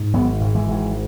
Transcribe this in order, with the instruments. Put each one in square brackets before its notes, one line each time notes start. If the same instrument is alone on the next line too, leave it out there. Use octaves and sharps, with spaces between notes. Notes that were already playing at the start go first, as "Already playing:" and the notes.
Already playing: [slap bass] G#2
G#1 F#3 B3
G#1
E3 G#3
G#1